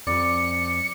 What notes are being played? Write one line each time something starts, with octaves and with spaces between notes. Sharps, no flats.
F2 D5 C#7